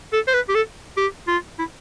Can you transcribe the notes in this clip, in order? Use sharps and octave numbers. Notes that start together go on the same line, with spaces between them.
A4
C5
B4
G4
A4
G4
F4
E4